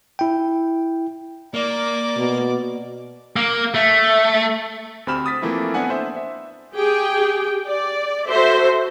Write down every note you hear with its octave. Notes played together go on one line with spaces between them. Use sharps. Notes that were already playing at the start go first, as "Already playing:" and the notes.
E4 G5
A#3 D5 D6
B2
A#3
A3
D2 C4 G4 B5 F6 E7
D#6 A6 B6
E3 F3 A3 A#3 C4 E4
A3 B3 C4 D4 F#5 G#5
C5 E5
E5
G4 G#4 G5
D5
F#4 A4 C5 E5 C6